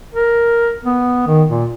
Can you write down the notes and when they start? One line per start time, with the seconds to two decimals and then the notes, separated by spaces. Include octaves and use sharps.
0.14 A#4
0.84 B3
1.27 D#3
1.49 A#2